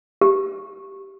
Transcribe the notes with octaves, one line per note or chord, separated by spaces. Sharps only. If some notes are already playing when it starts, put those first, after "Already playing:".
G4